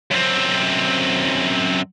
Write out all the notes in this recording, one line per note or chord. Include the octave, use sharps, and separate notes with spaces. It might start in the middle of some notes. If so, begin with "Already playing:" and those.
F#2 C4